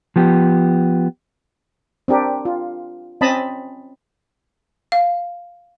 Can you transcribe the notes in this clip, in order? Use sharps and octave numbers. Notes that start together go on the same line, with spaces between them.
F3 B3 G4
C4 D4 G4 A#4
F4
C4 C#4 D#5 A5 B5
F5